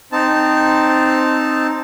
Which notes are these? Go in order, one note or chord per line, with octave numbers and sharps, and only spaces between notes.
C4 D#4 A5